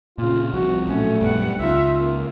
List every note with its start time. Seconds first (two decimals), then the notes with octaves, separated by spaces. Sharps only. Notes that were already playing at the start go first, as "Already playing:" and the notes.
0.18 A#2 C#3 F4
0.53 C2 C3 F3 F#4
0.87 A#1 A2 F#3 A3 C#4
1.21 A#1 F#2 G3 B3 F#5
1.60 C#2 D#4 F4 E5
1.98 A#3